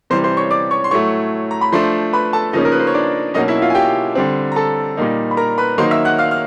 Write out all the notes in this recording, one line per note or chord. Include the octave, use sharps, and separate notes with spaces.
C3 E3 G3 C5 C6
C5 C6
C#5 C#6
D5 D6
C#5 C#6
C6
A2 F#3 A3 C#5 C#6
A#5
B5
F3 A3 D4 C5 C6
B4 B5
A4 A5
C#3 F3 A#3 C#4 D#4 D#5
A#4
B4
C5
C#5
D4 D5
B2 F#3 A#3 C#4 D#4 D#5
E4 E5
F4 F5
G#5
G4 G5
D3 G3 C4
A#5
A4 A5
A#2 G3 A#3 D#4
B5
A#4 A#5
B4 B5
D#3 F#3 A#3 D#4 C5 C6
E5 E6
F#5 F#6
F5 F6
F6